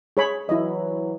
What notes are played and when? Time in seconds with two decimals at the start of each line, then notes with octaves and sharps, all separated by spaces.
0.17 G#4 C#5 B5
0.49 E3 F#3 E4 D#5